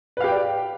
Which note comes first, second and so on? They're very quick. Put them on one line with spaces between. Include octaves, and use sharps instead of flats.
B4 F5 G4 G5 D5